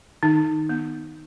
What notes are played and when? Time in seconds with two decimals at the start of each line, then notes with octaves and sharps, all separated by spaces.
0.23 D#3 D#4
0.69 B3